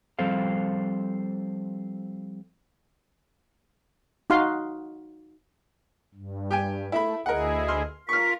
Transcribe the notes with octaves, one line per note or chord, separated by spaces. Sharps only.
F3 G3 C4 A4 C5 F5
D#4 F#4 F5 C6
G2
G4 G5 G#5
A3 E4 A4 E5 B5
D2 E4 G#4 A#4 D#5 F#5
C6 F6
F4 A#4 C#6 F6 B6